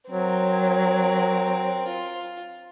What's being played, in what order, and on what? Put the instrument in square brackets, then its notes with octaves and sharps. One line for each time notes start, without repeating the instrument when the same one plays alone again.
[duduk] F#3 [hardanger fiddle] C4 A#4
[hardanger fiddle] F4